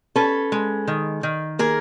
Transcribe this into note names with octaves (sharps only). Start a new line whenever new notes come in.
C#4 A4 B4
G#3
D#3
D#3
A#3 G#4 A#4